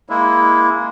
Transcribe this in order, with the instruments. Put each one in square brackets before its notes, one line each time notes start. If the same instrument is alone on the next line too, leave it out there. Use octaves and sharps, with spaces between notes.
[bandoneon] G#3 A#3 E4